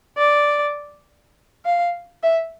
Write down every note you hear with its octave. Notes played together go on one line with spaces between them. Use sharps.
D5
F5
E5